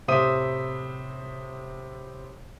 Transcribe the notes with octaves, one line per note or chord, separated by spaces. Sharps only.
A2 C3 C5 E5 D#6 D#7